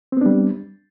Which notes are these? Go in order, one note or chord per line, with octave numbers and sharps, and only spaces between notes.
G3 B3 C4 D4